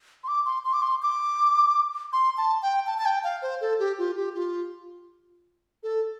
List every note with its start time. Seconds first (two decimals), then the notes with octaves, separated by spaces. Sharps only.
0.24 C6
0.28 D6
0.46 C6
0.65 C6
0.73 D6
0.82 C6
1.02 D6
2.13 C6
2.37 A5
2.62 G5
2.87 A5
2.98 A5
3.06 G5
3.24 F5
3.42 C5
3.61 A4
3.79 G4
3.98 F4
4.16 G4
4.35 F4
5.83 A4